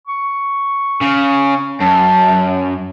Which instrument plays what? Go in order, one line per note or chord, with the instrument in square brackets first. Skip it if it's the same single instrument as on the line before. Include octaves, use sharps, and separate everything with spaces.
[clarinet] C#6
[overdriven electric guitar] C#3
[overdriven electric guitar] F#2 [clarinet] A5